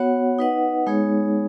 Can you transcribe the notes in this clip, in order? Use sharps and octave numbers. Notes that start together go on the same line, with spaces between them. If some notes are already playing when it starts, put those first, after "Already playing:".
Already playing: B3 F#4 C#5 F#5
D#4 B4 D#5 F#5
G#3 B3 D#4 G#4 C#5